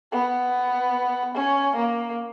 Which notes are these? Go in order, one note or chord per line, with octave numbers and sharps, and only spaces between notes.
B3
C#4
A#3